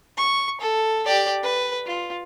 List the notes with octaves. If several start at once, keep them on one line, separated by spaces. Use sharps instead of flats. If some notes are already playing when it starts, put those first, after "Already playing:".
C#6
A4
G4 D5
B4
F4